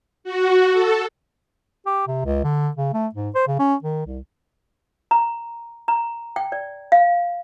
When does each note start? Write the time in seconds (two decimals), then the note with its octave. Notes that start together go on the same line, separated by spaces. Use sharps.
0.24 F#4
0.72 A4
1.86 G4
2.08 C3
2.25 C#2
2.44 D3
2.77 C#3
2.93 A3
3.14 G#2
3.35 C5
3.47 C#3
3.59 C#4
3.83 D#3
4.06 C2
5.11 A#5
5.88 A#5
6.36 G5
6.52 D5
6.92 F5